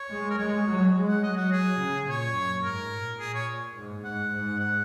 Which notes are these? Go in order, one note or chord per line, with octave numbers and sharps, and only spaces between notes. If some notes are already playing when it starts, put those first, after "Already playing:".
Already playing: C#5
G#3
A#4
G#3 C#5
F#3
G#3
F#5
F#3 D#5
F#4
G#4
C#3
A#2 C#5
F#2
G#2 A#4
A#2
A#2 G#4
C#5
G#2
G#2 F#5
G#2
F#5